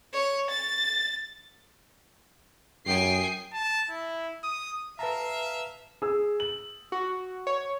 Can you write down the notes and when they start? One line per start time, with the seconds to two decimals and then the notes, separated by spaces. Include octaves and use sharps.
0.13 C#5
0.50 A6
2.86 F#2 G5 G#5 D#6 C7
3.53 A5
3.90 E4
4.44 D#6
4.99 B4 E5 F5 A5 A#5
6.02 G#4 E6
6.40 F#7
6.92 F#4
7.47 C#5